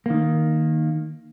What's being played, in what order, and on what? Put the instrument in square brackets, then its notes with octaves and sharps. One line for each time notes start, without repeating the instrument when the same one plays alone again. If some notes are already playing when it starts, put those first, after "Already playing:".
[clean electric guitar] D#3 A#3